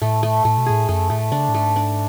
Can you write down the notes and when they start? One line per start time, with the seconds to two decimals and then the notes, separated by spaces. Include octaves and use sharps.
0.02 A2 A3
0.23 A3
0.45 A2 A3
0.58 B2
0.66 A2 G#4
0.89 F#2 A3
1.10 A2 A3
1.32 C#3 D4
1.49 A2
1.54 G#2 A3
1.76 D4